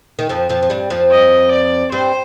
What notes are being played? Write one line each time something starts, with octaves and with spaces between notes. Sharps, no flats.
D#3
F2 F3
F2 F3
F3
G2 G3
F2 F3
D#5
D5
G2 G3 C5